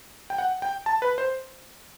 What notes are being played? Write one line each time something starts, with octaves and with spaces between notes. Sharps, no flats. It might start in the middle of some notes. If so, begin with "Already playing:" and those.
G5
F#5
G5
A5
B4
C5